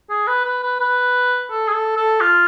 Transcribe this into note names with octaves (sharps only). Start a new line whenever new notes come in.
G#4
B4
B4
B4
B4
A4
G#4
A4
A4
F4